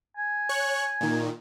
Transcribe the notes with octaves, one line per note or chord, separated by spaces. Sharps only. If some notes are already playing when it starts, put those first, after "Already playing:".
G#5
C#5 C#6 F#6
A#2 D#3